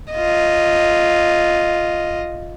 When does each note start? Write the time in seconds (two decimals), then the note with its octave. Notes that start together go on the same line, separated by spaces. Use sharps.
0.13 F4 D#5